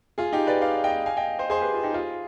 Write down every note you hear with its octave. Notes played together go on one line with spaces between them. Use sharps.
F4 G#4
D#4 G4
B4 D5
D5 F5
D#5 G5
F5 G#5
D#5 G5
C5 D#5
G#4 C5
G4 B4
F4
D#4 G4
F4 G#4